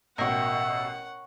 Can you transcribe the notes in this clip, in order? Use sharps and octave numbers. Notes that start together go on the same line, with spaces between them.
A1 B2 A#4 C#5 E5 F#5 G5